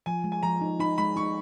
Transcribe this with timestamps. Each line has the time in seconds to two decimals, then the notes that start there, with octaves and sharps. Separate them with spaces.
0.06 F3 G#5
0.24 G#3
0.32 G#5
0.43 F3 A#5
0.61 D#4
0.79 D#4 B5
0.98 G#3 B5
1.16 D#4 C#6